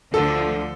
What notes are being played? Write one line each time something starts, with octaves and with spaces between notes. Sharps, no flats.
D2 D3 F3 A4